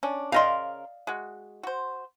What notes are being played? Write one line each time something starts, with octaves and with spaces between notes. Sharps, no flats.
C#4 D4
C#3 A#4 D5 D#5 F5 C6
G#3 F#4
F#4 C5